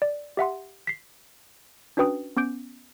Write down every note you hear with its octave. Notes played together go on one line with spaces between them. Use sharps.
D5
G4 E5 F#5 C6
B6 C7
C#4 D4 F#4 B4 G5 D#6
B3 C#4 D6 G6 D7